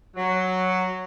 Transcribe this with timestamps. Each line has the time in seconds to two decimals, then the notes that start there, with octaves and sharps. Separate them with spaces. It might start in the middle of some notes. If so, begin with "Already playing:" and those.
0.17 F#3